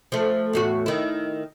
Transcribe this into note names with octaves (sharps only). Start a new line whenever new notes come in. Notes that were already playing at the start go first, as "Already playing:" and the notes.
F3 A3
E2 A2 F#4
D#3 E4